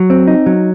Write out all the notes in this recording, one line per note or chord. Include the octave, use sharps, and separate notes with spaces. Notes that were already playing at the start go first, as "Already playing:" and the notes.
Already playing: F#3
C4
D#4
F#3